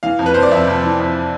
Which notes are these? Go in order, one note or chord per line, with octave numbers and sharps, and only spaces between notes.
E3 F5
F2
B4
F2 C5
D5
F2 E5
F2
E3
F2